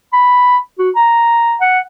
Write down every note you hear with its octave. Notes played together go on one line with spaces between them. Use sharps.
B5
F#4
A#5
F#5